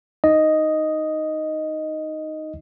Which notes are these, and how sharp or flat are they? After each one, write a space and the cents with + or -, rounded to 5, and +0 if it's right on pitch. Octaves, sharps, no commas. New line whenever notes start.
D#4 +0 D#5 +0